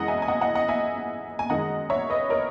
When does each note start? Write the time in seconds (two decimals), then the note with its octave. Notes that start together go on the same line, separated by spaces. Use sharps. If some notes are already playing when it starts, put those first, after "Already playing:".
Already playing: F#2 E3 G#3 D#5 F#5
0.08 E5 G#5
0.22 G#5
0.28 D#5 F#5
0.41 D#5 F#5
0.55 D#5 F#5
0.68 E5 G#5
1.39 G#5
1.49 F#2 D#3 G#3 D#5 F#5
1.90 C#5 E5
2.10 B4 D#5
2.30 A#4 C#5